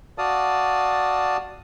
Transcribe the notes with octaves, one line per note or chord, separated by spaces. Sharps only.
F#4 D5 F5 A5 D#6